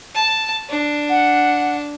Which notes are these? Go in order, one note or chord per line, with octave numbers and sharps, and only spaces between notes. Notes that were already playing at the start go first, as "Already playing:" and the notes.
A5
D4
F#5